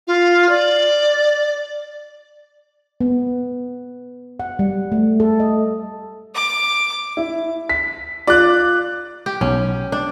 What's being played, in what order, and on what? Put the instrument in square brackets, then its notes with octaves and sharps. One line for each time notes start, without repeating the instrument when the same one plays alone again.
[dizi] F4
D5
[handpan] B3
F#5
G3
A3
A4
D#5
[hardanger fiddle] D6
[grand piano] E4
B6
[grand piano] F4 F#6 [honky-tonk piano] D5
[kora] G4
[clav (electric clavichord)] B1 [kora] C#4
[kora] D4